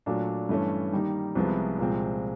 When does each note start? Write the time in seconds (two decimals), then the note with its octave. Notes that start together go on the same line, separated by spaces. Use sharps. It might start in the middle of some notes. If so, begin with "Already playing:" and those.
0.06 A#2 F#3 A3 D4
0.49 G2 E3 A3 C#4
0.93 D#3 G3 A#3 D#4
1.35 C2 C3 F3 G#3 B3
1.79 C2 A#2 F3 G#3 C4